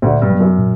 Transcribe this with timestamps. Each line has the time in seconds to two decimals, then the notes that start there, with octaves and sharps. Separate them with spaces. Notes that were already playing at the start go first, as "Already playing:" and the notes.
0.02 D2 A#2 D3
0.22 G2
0.30 F#3 B3
0.40 F#2
0.58 A#2